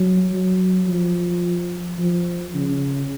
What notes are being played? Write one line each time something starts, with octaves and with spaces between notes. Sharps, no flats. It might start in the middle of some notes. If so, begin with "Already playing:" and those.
Already playing: F#3
F#3
F3
F3
C#3